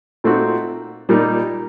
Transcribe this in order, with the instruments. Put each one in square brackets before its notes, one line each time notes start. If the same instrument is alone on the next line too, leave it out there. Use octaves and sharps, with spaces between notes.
[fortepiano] A#2 A3 C4 D#4 F#4
A#2 G3 A#3 D#4